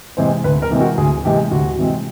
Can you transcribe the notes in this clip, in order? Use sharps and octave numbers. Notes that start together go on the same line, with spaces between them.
C3 E3 G#3 C4 C5
D2 B4
A#4
C3 E3 G#3 C4
F#4
D2 G#4
C3 E3 G#3 C4 G4
D2 F#4
C3 E3 G#3 C4